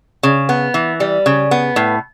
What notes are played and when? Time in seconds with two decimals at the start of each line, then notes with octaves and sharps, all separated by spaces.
0.23 C#3
0.49 B3
0.74 E3
1.00 G3
1.26 C#3
1.51 B3
1.76 A2